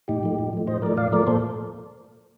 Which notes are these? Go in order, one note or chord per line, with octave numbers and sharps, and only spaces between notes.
A2 D#4 G4
F3 A3
A2
F3 A3
A2 C5 D#5
F3 A3 A#4 D5
A2 D5 F5
F3 A3 A#4 D5
A#2 A4 C5